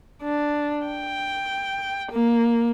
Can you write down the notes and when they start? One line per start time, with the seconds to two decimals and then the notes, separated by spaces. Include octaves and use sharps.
0.23 D4
0.87 G5
2.12 A#3